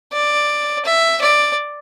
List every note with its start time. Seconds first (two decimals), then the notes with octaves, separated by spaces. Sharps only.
0.13 D5
0.85 E5
1.21 D5